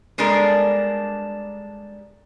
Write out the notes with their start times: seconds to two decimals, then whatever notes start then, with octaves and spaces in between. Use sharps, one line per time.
0.18 G3 G#3 B3 D4 A4 A#4